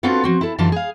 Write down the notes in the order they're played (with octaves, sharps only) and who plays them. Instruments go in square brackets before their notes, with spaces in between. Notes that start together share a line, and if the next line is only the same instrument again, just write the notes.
[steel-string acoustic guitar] B3 C4 D4 F4 F#4 A4
F3 C4 F#4
E4 A4
F#2 D3 E3 D4 F4 A5
G#4 F5